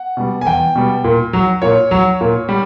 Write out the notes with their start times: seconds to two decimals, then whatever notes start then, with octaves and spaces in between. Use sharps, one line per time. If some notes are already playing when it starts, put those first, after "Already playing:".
Already playing: F#5
0.17 B2 G3
0.41 G#5
0.46 E2 G5
0.75 B2 G3
1.04 A#2
1.33 F#3
1.62 A#2 C#5
1.91 F#3
2.21 A#2
2.49 G3